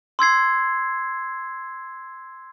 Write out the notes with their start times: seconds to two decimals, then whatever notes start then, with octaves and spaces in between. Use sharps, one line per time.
0.19 C6 E6 G#6 C7